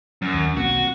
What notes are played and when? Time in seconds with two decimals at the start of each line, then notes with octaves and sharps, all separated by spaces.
0.22 F#2
0.34 D#2
0.57 B1 A#3 C4 F#4